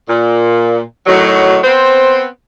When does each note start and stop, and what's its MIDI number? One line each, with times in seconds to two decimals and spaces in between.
0.09 0.81 46
1.06 1.58 45
1.06 1.58 51
1.06 1.58 54
1.64 2.26 59
1.64 2.26 60
1.64 2.26 72